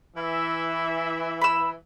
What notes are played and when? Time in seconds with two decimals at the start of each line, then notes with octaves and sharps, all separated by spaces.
0.16 E3 E5
1.41 B5 E6